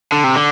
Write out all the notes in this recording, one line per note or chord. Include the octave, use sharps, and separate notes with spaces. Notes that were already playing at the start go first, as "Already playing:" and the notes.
D3
C3
D3